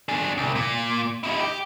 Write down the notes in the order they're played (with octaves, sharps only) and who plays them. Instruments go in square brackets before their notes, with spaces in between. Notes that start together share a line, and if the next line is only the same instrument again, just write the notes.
[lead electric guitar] D4 G#4
C2
A#2
D#4 E4
G4